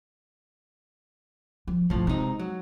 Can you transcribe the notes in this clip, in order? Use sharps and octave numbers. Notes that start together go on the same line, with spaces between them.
F3
G#1 A2 C#3 F3
C3 G#3 D#4
F#3